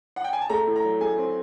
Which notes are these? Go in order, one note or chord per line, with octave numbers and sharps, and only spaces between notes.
F#5
G5
G#5
A5
A3 A#5
A2
A#5
F#3
A3 G#5
C4